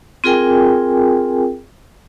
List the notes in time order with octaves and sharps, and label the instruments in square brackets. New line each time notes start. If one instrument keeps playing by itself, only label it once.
[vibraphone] C4 F4 G#4 A#4 G5 G#5